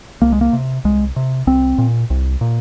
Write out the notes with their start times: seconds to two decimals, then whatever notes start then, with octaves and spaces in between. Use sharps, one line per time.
0.22 C2 A#3
0.32 G#3
0.41 A#3
0.53 C3
0.85 C2 G#3
1.16 C3
1.47 C2 C4
1.78 A#2
2.10 C2
2.41 A#2